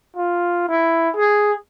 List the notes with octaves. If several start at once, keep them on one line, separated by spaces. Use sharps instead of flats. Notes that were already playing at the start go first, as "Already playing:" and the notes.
F4
E4
G#4